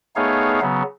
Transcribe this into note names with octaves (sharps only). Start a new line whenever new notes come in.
A3 B3 D#4 G#4 C#5 F5
C#3 F#3 B3